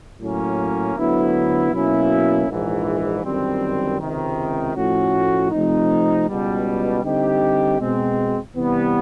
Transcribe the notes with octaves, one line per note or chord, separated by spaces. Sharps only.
A2 F#3 A#3 C#4
D2 D3 F#3 B3 E4
B2 F#3 A#3 C#4 E4
A#1 G#2 E3
G1 F#2 D#3 G3 C4
C#2 C3 D#3
A2 F3 A3 C#4 F#4
C3 F3 A3 C4 D#4
C#2 B2 G3
D3 G3 C4 D#4 G4
B2 G#3 C4
C3 E3 G3 B3